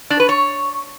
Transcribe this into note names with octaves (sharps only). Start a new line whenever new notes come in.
D4
B4
C#5